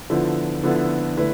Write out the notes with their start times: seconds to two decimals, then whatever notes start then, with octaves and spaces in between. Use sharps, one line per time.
0.10 D3 F3 B3 E4 A4
0.63 D3 F3 B3 E4 A4
1.17 D3 A3 E4 B4